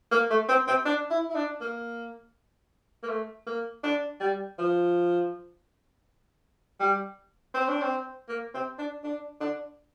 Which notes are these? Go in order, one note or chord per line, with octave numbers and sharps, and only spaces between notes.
A#3
A3
C4
C4
D4
E4
E4
D4
A#3
A#3
A3
A#3
D4
G3
F3
G3
C4
D4
C4
A#3
C4
D4
D4
D4